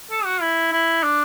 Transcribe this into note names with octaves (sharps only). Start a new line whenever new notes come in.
A4
F#4
E4
E4
D4